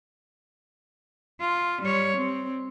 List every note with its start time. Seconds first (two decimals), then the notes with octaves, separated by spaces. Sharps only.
1.40 F4
1.82 G3 C#5
2.16 C4